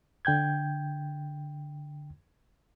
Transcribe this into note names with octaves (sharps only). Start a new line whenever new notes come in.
D3 G5 G6 G#6